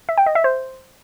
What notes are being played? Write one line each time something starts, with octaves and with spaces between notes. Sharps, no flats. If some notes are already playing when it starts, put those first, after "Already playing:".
E5
G5
D#5
E5
C5